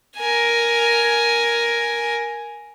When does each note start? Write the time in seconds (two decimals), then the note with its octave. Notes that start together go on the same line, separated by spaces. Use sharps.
0.18 A#4 G#5